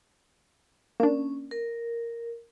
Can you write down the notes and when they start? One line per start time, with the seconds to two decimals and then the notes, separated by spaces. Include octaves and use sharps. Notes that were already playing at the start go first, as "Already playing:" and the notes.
1.00 A#3 C#4 D4
1.51 A#4